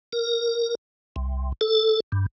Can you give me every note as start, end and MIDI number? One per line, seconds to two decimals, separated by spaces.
0.13 0.75 70
1.16 1.52 36
1.61 2.00 69
2.12 2.26 43